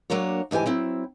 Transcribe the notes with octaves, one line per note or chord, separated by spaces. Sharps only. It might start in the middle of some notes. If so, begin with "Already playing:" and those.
F#3 A#3 D4 A#4 C#5
D2 G#2 E3 G4 G#5
F#3 C4 E4